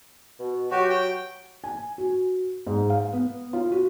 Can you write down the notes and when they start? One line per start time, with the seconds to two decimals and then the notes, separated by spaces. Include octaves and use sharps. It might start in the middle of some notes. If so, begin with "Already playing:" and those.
0.40 B2
0.71 F#3 F#4 G4
0.90 G5
1.64 G#5
1.98 F#4
2.67 G#2
2.90 F5
3.13 B3
3.53 F4
3.72 F#4